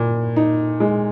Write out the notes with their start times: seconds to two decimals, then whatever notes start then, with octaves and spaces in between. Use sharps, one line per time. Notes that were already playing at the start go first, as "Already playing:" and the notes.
Already playing: A#2
0.36 D#4
0.80 G#3